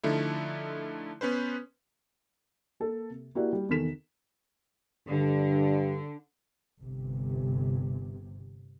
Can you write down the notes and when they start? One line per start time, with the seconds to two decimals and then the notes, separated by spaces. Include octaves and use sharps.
0.03 D3 F3 A3 D#4 E4
1.21 B3 C#4 B4 C5
2.80 A#3 A4
3.10 C3
3.35 A#3 E4 F#4 G4 D5 F#5
3.53 G3
3.69 E2 C3 D#3 A4 B6 E7
5.08 G2 D3
6.79 G1 C3